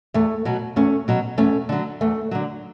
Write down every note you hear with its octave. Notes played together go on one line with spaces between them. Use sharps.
E2 A3
B2 F#3
E2 A3 C#4
B2 F#3
E2 A3 C#4
D3 F#3
E2 A3
D3 F#3